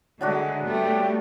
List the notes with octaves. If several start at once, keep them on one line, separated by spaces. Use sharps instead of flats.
D3 F#3 G#3 D4 F#4 E5
G3 A3 B3 G4